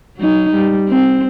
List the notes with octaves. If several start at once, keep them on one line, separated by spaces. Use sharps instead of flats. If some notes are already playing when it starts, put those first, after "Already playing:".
F#3 D#4
G3
C4